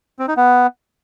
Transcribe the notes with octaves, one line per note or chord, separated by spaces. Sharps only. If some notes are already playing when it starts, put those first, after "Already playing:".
C4
D#4
B3